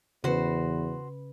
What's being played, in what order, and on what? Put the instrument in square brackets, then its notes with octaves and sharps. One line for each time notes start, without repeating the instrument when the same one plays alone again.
[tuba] E2 [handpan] C#3 B4 [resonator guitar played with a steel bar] F#4 C5